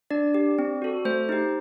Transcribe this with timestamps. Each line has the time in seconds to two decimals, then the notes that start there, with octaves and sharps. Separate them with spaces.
0.11 D4 D5
0.34 G4
0.59 C4
0.82 F#4 A4
1.05 A3 C5
1.29 D#4 G4